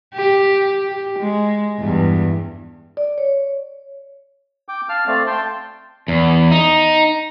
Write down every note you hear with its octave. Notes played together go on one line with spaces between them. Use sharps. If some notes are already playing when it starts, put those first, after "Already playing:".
G4
G4
G#3
E2 G2
D5
C#5
G5 D6
F5 A5 F6
A3 C4 D5 F5
G5 A5 C6
E2
D#4